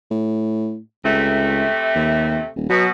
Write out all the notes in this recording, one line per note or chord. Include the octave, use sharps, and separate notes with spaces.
A2
C#2 C3 A3
D#2
D#1
B2 F#3